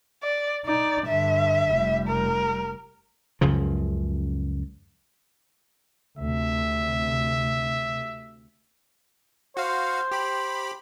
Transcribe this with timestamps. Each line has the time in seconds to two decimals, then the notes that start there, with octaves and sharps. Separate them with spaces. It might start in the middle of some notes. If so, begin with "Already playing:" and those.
0.23 D5
0.66 D#4 D5
1.07 G2 D3 E5
1.71 F1 G3
2.08 A#4
3.41 C#2 F#2 C#3 F3
6.19 D2 C3 E5
9.57 F#4 C5 F5
10.11 G4 B5